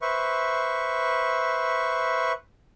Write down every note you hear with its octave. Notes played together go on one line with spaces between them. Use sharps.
B4 C5 E5 C#6